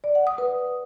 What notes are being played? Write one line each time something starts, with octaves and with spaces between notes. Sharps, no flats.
D5
F#5
D#6
B4